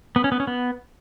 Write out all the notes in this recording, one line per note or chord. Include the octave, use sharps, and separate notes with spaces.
B3
C#4
B3
C#4
B3